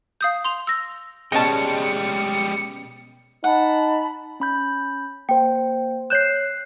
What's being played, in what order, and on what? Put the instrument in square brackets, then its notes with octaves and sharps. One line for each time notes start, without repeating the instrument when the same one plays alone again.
[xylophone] F5 D#6 G6
C6 F7
E6 A#6
[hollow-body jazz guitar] B2 C#4 G5 [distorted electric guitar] G3 G#3 [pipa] D#5 A5 [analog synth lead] C#7
[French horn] D#4 [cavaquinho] F#5 [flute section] A5 B5
[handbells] C#4 B5 G6
[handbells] A#3 C5 [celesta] G5
[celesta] C#5 G6 E7 [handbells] F#6 C7